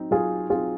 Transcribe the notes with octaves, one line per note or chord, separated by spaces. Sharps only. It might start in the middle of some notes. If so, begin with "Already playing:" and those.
Already playing: F#3 C4 D#4
F#3 F4 G#4
C4 D#4 F4 G#4